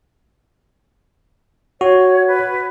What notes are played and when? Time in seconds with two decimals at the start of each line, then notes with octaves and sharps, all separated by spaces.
1.81 F#4 C#5
2.27 B4